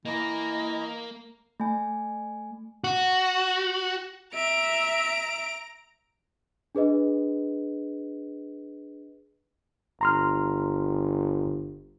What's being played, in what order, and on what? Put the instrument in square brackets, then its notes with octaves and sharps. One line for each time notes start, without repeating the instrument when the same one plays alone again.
[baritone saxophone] E3 [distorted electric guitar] A#3 A#4 [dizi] D#5
[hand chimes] A3 G#5
[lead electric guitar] F#4
[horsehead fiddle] E5 [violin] A#5 D7
[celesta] D4 G#4 B4 D#5
[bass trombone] G1 [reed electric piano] A#5 C6 F6